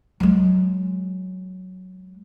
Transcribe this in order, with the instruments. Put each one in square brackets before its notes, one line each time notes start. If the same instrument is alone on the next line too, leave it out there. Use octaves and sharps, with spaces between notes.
[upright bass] F#3 G#3